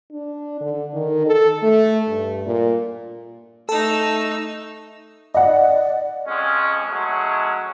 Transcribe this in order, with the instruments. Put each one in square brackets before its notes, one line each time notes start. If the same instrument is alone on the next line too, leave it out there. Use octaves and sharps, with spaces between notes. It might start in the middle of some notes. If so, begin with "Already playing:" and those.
[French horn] D4
D3
D#3
A4
A3
G2
A#2
[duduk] A3 [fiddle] D#4 E6 [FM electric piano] A4
[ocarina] D5 [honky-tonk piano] D#5 F#5
[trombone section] F2 G#3 C#4
F#3 G#3 A3 C#4